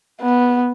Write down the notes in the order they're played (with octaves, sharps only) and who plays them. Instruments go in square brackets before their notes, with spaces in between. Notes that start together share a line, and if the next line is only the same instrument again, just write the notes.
[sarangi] B3